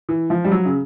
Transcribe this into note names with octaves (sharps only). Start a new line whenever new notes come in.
E3
F3
G3
F#3
C#3